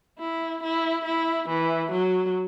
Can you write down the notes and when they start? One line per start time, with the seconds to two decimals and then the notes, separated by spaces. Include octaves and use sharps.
0.19 E4
0.63 E4
1.05 E4
1.49 E3
1.92 F#3